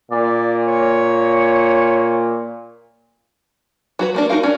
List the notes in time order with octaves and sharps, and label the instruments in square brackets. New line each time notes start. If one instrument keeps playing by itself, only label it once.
[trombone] A#2 [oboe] D5
[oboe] C#5
[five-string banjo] F#3 F#4 B4
A3 A#3 D4
D#4 F#4 A#4 F5
C#4 D4